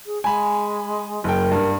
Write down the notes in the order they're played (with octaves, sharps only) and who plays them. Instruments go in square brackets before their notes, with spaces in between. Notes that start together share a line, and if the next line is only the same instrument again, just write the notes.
[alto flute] G#4
[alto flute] G#3 [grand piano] G#5 B5
[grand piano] F#1 G5 [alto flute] A#4
[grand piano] G2